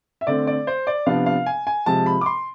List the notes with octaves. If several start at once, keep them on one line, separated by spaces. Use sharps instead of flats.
E5
D3 A3 C4 D5
D5
C5
D5
C3 F3 B3 D4 F5
F5
G#5
G#5
C3 F3 G#3 A5
B5
D6
C6